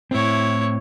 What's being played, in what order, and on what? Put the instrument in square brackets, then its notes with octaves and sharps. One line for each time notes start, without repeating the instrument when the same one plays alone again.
[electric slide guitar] A2 C4 [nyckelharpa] E4 C#5